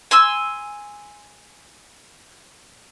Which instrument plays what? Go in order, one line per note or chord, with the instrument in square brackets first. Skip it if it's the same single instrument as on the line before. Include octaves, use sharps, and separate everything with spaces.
[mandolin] G#5 C6 E6